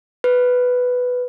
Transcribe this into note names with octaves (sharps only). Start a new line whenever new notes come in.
B4